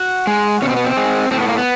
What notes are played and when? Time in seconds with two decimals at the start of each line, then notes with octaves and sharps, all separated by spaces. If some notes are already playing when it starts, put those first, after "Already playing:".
Already playing: F#4
0.27 G#3
0.62 B2 C#4
0.70 C4
0.77 B3
0.84 C4
0.97 G#3
1.31 A2 C4
1.40 B3
1.49 A#3
1.58 B3